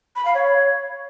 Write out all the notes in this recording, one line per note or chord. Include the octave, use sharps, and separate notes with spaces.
B5
F5
C#5